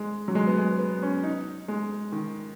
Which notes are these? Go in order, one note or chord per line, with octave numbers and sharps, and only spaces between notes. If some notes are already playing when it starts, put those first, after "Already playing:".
Already playing: G#3
F#3
G#3
B3
G#3
B3
C#4
D#4
G#3
D#3